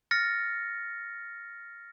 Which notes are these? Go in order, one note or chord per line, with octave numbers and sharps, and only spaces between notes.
F6 A6 A#6 C#7